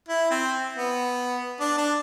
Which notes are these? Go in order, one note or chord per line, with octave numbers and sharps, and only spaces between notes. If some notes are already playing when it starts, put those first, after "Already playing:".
E4
C4
B3
D4
D4